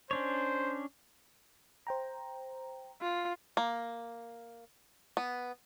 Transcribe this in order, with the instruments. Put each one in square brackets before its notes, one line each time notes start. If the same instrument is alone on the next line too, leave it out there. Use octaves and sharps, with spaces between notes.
[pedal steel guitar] C#4 D4 C#5 [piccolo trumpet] C5
[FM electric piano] C5 G5 A#5
[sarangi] F4
[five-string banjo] A#3
B3